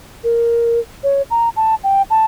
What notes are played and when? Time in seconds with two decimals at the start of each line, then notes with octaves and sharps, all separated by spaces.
0.24 A#4
1.04 C#5
1.31 A#5
1.56 A5
1.84 G5
2.10 A5